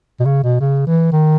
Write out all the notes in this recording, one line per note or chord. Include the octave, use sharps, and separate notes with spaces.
B2
C#3
B2
C#3
E3
D#3